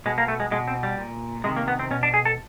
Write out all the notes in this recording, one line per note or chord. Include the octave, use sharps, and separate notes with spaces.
B2 G#3
A#3
A3
G#3
B2 G#3
C4
G3
A#2
C3 D#3 G#3
A#3
B3
C4
B2 C#4
D4
G#4
A4